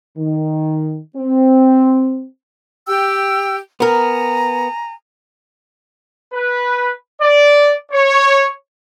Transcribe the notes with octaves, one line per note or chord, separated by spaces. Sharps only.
D#3
C4
G4 G5 E6
B3 A#4 G#5 A#5
B4
D5
C#5